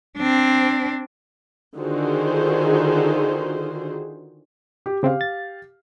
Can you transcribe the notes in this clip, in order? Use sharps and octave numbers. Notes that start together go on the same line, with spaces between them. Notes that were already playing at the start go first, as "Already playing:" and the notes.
C4 D4
D3 D#3 F4 F#4 G#4 C5
G4
C#3 C4 G4 F5
A6